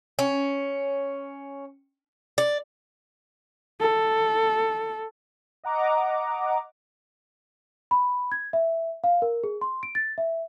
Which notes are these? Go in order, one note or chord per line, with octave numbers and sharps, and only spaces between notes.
C#4
D5
A4
D#5 F#5 A#5 D6
B5
G#6
E5
F5
A#4
G#4
C6
D7
A6
E5